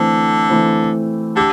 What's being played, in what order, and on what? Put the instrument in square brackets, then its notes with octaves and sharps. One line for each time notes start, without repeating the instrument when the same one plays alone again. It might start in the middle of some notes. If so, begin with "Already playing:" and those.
Already playing: [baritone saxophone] D3 [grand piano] E3 A3 C4
[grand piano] E3 A3 C4
[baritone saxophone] D3 [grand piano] G4